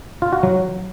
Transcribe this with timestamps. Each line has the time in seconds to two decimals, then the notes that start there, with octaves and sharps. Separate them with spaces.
0.22 F4
0.33 F#4
0.43 F#3